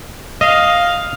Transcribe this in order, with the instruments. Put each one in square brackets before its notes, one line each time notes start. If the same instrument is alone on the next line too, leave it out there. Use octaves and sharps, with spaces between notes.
[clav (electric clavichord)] D#5 [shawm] F5